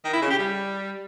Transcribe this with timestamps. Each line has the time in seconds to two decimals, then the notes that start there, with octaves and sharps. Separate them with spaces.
0.05 D#3
0.13 E4
0.22 C#3
0.30 G4
0.39 G3